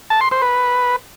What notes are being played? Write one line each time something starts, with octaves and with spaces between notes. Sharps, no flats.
A5
C6
C5
B4